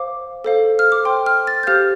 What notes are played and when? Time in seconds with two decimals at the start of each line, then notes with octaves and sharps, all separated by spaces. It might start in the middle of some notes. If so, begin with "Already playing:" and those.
Already playing: C5 F5 D6
0.44 A4 C5 F5
0.79 F6
0.92 D6
1.05 C5 G5 C6
1.26 F6
1.47 A6
1.63 G6
1.67 G4 C5 F5 F6